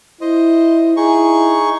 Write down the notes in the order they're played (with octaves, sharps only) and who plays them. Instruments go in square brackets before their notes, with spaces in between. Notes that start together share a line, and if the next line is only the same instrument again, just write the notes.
[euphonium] E4 [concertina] C5 D#5
[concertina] D#4 G#4 C#6 [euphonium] E4